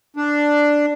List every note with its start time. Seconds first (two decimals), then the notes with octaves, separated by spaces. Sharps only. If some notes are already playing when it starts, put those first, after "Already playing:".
0.16 D4